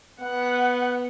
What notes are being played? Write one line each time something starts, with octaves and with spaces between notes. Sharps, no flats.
B3 F#5